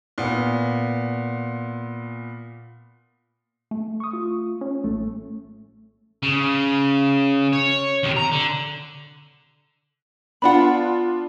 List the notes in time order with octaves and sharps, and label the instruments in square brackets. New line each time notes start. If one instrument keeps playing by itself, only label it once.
[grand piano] A#2 B3
[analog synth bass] A3
[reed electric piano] C#6 D#6
F4
[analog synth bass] C#4
[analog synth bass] A1 [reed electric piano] A3
[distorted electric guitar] C#3
C#5
D#2 C3
A#5
D3
[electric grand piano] B3 D4 F4 [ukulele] F#5 B5